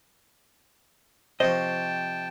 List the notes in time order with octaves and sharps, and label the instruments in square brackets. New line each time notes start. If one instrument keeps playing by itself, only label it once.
[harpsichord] C3 F3 [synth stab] C5 C#6 [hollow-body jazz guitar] D#5 [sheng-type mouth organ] G5 A5